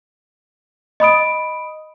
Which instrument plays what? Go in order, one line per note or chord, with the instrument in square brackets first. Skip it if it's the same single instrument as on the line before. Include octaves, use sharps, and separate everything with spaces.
[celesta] D#5 B5 D#6 D7